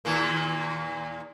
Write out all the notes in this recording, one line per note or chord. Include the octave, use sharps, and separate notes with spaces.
D#2 A#2 A#3